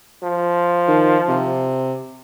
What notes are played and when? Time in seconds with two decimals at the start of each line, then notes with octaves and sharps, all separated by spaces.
0.23 F3
0.88 D#3
1.28 C3